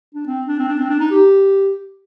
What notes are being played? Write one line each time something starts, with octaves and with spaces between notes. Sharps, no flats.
D4
C4
D4
C4
D4
C4
D4
D#4
G4